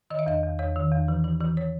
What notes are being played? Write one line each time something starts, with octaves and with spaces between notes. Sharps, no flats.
D#3 D#5
E5
E2 D#5
E2
E2 C#5
D#3
E2
E3
E3
E3
C#5